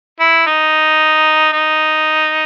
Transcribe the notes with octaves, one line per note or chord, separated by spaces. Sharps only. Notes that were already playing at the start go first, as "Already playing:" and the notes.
E4
D#4
D#4